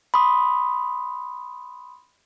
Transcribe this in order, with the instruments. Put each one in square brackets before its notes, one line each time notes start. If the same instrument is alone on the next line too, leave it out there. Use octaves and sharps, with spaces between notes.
[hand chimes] B5 C6 D#6